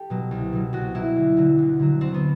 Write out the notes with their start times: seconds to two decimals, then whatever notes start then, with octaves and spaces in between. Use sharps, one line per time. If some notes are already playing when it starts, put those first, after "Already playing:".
Already playing: G4 A4
0.10 B2 F#3
0.31 C2
0.53 B2 F#3
0.73 C2 F#4
0.94 B2 F#3 E4
1.16 D2
1.37 D3 F#3
1.59 D2
1.80 D3 F#3
2.01 D2 C4
2.14 B3